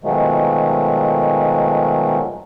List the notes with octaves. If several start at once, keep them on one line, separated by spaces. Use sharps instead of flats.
B2 D#3 F3 F#3 G#3 A3